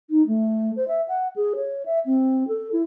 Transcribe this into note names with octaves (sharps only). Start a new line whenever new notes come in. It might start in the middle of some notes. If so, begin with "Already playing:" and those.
D#4
A3
C5
E5
F#5
G#4
C#5
E5
C4
A4
E4